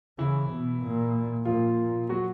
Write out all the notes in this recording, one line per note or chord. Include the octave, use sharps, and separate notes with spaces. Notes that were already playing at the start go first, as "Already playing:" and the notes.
C#3 E3 E4
B2
A#2
A#2 F3 F4
F#3 F#4